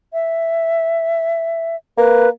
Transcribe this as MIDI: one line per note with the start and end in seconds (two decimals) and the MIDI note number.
0.13 1.76 76
1.98 2.28 58
1.98 2.29 71